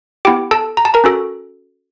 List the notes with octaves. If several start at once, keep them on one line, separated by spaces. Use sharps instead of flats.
B3 E4 G4 G5
A4 A5
A#5
A5
A#4 A#5
C#4 F#4 A4